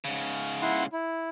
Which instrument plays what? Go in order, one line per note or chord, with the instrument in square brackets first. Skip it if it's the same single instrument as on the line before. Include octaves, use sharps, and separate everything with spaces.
[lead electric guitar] G#2 C#3
[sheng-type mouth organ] E4 F#5 C6
E4